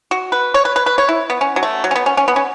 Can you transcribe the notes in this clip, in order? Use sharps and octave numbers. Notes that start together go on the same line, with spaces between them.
F#4
B4
C#5
B4
B4
B4
C#5
E4
B3
C#4
F#3
A3
F#3
C#4
B3
C#4
C#4
B3
C#4